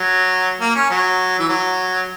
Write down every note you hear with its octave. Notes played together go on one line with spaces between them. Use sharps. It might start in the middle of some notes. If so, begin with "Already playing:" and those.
Already playing: F#3
A#3
C#4
F#3
E3
F#3